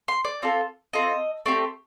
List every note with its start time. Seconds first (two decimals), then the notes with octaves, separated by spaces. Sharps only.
0.08 C6
0.25 D5
0.42 C4 F4 A4
0.93 C4 F4 A4 D#5
1.46 A3 C4 G4 D5